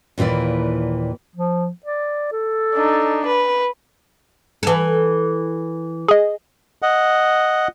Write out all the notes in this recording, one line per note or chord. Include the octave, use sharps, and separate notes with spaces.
D#2 A#2 E3 E4 D5
F3
D5
A4
D4 D#4
B4
E3 A4
G#4 D#5
D#5 F#5